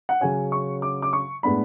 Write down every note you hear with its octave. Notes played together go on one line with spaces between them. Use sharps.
F#5
C#3 F#3 C#4 G#5
C#6
D6
D6
C#6
A2 G#3 B3 D4 B5